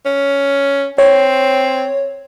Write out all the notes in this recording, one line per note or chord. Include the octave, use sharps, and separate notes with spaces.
C#4
C4 C#5